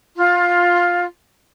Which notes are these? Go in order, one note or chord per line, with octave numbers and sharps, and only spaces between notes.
F4